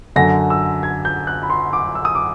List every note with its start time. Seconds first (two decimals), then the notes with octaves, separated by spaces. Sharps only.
0.16 F#2 D3 A#6
0.50 E6
0.83 G#6
1.05 G6
1.27 F#6
1.43 B5
1.50 C6
1.73 D6
1.95 E6
2.05 D#6
2.15 D6